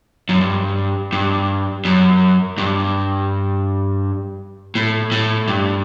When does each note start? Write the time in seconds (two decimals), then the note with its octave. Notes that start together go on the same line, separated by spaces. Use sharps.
0.29 F#2
0.41 G2
1.13 G2
1.85 F#2
2.58 G2
4.75 A2
5.12 A2
5.48 G2